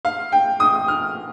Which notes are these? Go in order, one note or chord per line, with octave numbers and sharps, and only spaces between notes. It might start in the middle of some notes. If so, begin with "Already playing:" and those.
F5
G5
D#6
F6